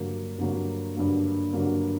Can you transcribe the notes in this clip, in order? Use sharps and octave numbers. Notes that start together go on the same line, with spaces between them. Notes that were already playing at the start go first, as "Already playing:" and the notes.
Already playing: G2 D3 F#3 A#3
G2 D3 F#3 A#3
G2 D3 F#3 A#3
G2 D3 F#3 A#3